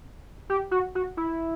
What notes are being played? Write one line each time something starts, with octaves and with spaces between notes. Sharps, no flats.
G4
F#4
F#4
E4